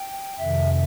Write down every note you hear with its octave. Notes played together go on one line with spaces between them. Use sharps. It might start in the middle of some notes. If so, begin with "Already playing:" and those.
Already playing: G5
F2 C3 D#3 E5